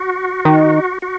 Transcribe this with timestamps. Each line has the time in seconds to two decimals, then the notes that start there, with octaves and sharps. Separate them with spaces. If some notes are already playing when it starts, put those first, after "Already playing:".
Already playing: F#4
0.45 D#3
1.02 F#4